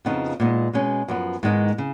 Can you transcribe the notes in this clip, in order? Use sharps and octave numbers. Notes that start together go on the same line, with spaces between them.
F2 C#3 F3 B3 D#4
A#2 G#3 B3 D#4
B2 G#3 C#4
F#2 F3 B3
G#2 D#3 G#3 B3 D#4
C#3